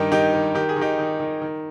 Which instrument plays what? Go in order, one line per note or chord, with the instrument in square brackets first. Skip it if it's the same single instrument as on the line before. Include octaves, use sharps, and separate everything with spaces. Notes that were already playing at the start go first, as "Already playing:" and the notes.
Already playing: [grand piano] G2 D#3 D#4 G4
D#3 D#4 G4
D#3
D#3 G4
G#4
D#3
D#4 G4
D#3
D#3
D#3